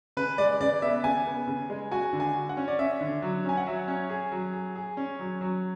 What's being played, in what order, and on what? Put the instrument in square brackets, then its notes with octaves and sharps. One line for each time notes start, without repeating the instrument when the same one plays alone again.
[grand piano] C#3 [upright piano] B4
[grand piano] G#3 [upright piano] D5
[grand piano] C#3 [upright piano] D5
[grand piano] B3 [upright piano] E5
[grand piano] C#3 [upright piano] G#5
[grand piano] B3
C#3
G#3
[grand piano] F#4 [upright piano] G#5
[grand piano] D3
[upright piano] G#5
[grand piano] F#4
[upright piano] F#5
[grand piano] C#4
[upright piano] D5
[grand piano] C#4 [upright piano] E5
[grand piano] D3
F#3
[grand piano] C#4 [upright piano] G#5
[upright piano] F#5
[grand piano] F#3 [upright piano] E5
[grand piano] C#4
G#4
F#3
G#4
G#4
C#4
F#3
F#3